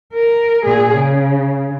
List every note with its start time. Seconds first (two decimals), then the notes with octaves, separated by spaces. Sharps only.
0.13 A#4
0.65 A#2 G#4
0.96 C#3